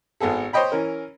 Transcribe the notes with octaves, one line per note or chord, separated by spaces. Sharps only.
G#1 B3 G#4 A4
C5 C#5 D#5 G5 B5
E3 C#4 A#4